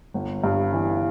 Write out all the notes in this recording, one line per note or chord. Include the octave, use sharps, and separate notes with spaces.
G1
G2
E3